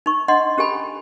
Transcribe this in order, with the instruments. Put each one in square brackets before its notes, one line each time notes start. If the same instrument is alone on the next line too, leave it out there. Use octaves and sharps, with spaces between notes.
[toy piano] D#4 C#6
D4 D#5 F#5 C6
C#4 G4 A4 G#5 B5